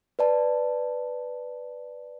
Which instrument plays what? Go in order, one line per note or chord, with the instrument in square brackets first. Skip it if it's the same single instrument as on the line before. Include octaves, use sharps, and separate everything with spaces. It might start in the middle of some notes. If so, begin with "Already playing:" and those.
[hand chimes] B4 D5 A5